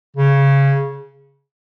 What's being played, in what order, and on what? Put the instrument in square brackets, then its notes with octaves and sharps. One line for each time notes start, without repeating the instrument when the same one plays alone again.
[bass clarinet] C#3